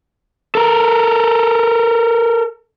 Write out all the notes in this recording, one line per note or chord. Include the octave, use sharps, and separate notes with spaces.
A4 A#4